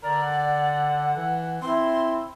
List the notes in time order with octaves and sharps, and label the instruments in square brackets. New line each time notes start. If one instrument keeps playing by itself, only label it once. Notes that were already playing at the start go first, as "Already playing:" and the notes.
[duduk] D3 [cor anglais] A#4 [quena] D5
[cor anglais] F#5
[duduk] E3
[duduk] C4 [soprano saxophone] E4 [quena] C6